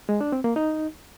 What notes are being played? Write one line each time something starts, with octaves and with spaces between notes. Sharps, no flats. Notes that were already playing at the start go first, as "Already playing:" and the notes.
G#3
D4
C4
A#3
D#4